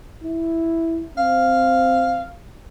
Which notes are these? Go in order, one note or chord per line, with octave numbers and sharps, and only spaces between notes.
E4
C4 F5